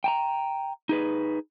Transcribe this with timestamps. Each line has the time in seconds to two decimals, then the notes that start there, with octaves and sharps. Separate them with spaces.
0.04 G5 A5 A#5
0.89 D#4 G#4 B4